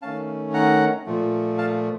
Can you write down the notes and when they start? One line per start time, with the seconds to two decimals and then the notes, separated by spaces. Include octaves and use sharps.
0.02 D#3 A3 C#4 F5 A5
0.54 F#5 A#5
1.06 A#2 F3 A3
1.58 F5 A5